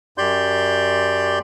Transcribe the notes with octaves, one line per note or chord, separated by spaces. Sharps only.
F#2 G4 D5 C6 G6